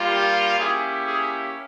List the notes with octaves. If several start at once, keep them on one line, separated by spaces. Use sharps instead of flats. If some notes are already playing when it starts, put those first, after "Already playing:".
Already playing: G3 A#3 F4
G4
A#3 C#4 E4 G4 G#4
G#4